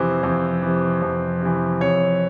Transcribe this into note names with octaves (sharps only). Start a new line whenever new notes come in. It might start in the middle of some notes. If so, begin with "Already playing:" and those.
Already playing: F2 C3 E3 C5
F2
C3 E3
F2
C3 E3
F2 C#5